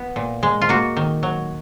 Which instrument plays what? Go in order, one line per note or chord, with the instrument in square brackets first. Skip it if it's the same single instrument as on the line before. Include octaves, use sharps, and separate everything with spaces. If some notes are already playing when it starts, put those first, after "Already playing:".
Already playing: [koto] B3
A#2
G#3
F4
A#3 F#4
D#3
F#3